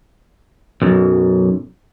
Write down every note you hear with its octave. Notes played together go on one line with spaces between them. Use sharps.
B1 F#2